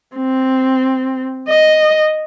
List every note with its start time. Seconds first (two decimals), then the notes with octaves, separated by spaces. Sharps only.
0.16 C4
1.49 D#5